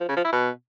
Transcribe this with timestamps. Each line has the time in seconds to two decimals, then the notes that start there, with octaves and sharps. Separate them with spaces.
0.01 F3
0.09 C#3
0.17 F3
0.25 E4
0.33 B2